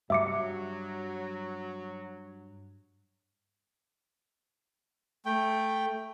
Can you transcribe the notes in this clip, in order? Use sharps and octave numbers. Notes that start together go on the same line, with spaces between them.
G2 F#3 E5 D6 C#7
A3 G5